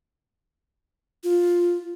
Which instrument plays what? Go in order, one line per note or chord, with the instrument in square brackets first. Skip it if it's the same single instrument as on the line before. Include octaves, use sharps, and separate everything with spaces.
[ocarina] F4